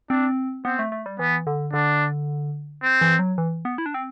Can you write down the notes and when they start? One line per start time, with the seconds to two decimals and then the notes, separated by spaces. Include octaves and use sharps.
0.10 C4 D4
0.65 B3 C4
0.79 A3
0.92 A3
1.06 G3
1.19 E3 B3
1.47 D3
1.73 D3 D4
2.83 C4
3.01 E3
3.19 F#3
3.38 E3
3.65 B3
3.78 E4
3.86 D4
3.94 C4